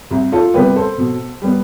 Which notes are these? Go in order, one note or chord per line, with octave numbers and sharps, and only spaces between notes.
C2
F4 A4
C3 G3 B3 G4 B4
A4 C5
B2
G3 B3